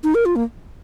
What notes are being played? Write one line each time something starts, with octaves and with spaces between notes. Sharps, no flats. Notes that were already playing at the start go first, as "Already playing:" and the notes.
D#4
A#4
F4
A#3